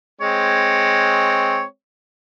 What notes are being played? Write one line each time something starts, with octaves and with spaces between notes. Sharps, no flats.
G#3 C4 C#5